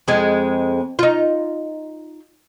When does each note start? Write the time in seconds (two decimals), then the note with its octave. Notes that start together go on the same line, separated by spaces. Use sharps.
0.08 F2 G#3
0.99 D#4 F4